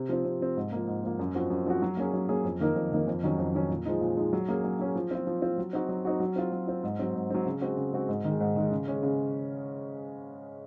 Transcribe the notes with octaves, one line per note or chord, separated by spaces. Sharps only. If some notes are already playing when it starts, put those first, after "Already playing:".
Already playing: C3
F3 C4
C3
F3 C4
G#2
F3 A#3
G#2
F3 A#3
F#2
F3 C4 F#4
F#2
F3 C4 F#4
F#3
A#3 C#4 G#4
F#3
A#3 C#4 G#4
F2
D#3 A#3 D#4 A#4
F2
D#3 A#3 D#4 A#4
F2
D#3 F#3 C#4
F2
D#3 F#3 C#4
A#2
F3 G#3 D#4
A#2
F3 G#3 D#4
F#3
A#3 C#4 G#4
F#3
A#3 C#4 G#4
F3
C4 F4
F3
C4 F4
F#3
C4 D#4 F#4
F#3
C4 D#4 F#4
F#3
C4 F4
F#3
C4 F4
G#2
F#3 C4
G#2
F#3 C4
C#3
G#3 C4 F#4
C#3
G#3 C4 F#4
G#2
D#3 G#3
G#2
D#3 G#3
C#3
G#3 C#4 G#4
C#3